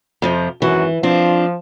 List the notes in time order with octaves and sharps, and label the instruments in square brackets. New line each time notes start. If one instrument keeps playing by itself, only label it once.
[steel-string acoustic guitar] F2 C3 F3
[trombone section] G#1 F#2 F#4 [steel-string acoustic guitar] E3
[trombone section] F3 [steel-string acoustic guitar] C4 D4 F4